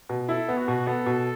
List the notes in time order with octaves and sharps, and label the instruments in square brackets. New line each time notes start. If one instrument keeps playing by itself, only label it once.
[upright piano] B2
[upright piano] E4 [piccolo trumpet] A4
[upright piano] B3
[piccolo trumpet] F#4
[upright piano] B2
[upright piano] B3 [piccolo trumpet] A4
[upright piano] B2